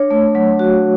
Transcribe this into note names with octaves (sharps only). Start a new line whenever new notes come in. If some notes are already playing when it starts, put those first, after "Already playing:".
Already playing: D4 C#5
A3
F#3
F#4